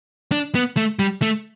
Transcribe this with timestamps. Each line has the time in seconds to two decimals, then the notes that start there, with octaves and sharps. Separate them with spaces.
0.32 D4
0.55 B3
0.77 A3
0.99 G3
1.22 A3